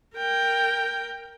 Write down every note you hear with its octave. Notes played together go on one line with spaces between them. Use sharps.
A#4 G5